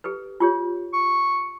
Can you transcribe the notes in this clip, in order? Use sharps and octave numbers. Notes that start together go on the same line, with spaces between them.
G4 A4 B4
F4 G4 C#5
C#6